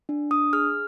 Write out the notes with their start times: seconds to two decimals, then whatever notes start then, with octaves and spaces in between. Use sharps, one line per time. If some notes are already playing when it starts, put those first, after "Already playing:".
0.09 D4
0.31 D4 D#6
0.53 G#4 F6